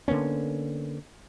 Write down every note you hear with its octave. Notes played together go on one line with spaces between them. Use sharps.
D3 A#3 B3 C#4